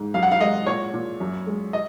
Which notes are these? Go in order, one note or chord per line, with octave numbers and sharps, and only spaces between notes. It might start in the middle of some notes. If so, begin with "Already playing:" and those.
Already playing: G#2
F#2 F5
F#5
F5
G#3 D#5
A#2 C#5
A#2
F#2
G#3
D#5